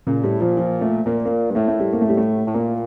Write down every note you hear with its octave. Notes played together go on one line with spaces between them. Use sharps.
A#2 C#3
A2 G3
A#2 F3
F3
A3
A#2 A#3
A#3
G2
A2 A3
A3
G3
A#3
A3
G3
A3
A2
A#2 A#3